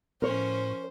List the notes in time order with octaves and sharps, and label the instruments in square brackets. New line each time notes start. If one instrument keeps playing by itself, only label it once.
[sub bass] A2 [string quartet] F3 C#4 [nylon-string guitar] A#4 C#5 [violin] C5